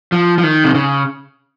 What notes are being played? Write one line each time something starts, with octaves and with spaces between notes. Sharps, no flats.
F3
F3
D#3
C3
C#3